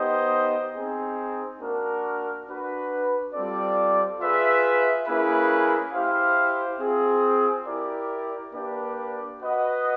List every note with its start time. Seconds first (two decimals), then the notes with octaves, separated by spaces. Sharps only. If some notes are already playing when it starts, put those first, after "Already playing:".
Already playing: B3 D#4 G4 C5 D#5
0.74 C4 D#4 G#4
1.60 A#3 D4 F#4 A#4
2.48 D4 F#4 B4
3.34 G3 C4 F4 A4 D5
4.20 F4 G#4 B4 E5
5.07 A#3 C#4 E4 G#4 B4
5.94 E4 G4 C5 F5
6.81 C4 F4 G#4
7.67 E4 G4 A#4 D5
8.53 A#3 D4 G4 B4 D5
9.40 F#4 B4 D#5 F#5